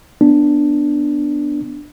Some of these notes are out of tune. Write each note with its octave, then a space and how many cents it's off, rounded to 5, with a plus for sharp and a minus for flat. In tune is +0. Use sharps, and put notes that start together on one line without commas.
B3 +0 D4 +0